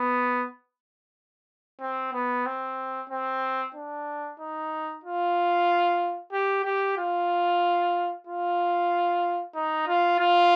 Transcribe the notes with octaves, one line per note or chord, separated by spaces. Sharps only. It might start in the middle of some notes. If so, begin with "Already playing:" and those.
Already playing: B3
C4
B3
C4
C4
D4
D#4
F4
G4
G4
F4
F4
D#4
F4
F4